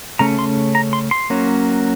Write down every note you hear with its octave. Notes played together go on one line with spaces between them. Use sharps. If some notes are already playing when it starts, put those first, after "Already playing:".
C#3 A3 C#4 A#5
C6
A#5
C6
C6
F#3 A#3 C#4